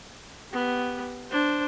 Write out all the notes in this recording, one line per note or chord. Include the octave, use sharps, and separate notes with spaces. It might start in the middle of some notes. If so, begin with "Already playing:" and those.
B3 G4
D4 C5